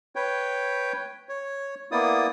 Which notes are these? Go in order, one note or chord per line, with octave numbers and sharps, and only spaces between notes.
B4 C#5 G5
C#5
A#3 B3 E4 D5 D#6